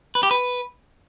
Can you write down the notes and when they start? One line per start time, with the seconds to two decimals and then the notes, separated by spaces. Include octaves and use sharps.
0.15 B4
0.23 G4
0.31 B4